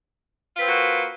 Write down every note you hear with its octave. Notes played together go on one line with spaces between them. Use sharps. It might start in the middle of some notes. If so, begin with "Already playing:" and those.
A#3 C4 F4 F#4 B4